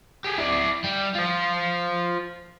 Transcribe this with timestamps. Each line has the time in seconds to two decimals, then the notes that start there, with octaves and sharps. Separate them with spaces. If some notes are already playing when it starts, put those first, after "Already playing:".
0.24 G4 G#4
0.38 E4 D5
0.84 G3
1.15 F4 C5